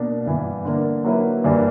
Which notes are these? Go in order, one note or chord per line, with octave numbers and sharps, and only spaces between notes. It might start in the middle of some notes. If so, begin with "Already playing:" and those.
Already playing: B2 A#3 D4
G2 E3 B3
D3 A#3 D4
F#3 A#3 E4 B4
G2 E3 G3 A#3 D4